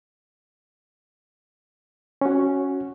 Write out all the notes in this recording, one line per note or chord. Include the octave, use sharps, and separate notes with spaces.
C#4 F#4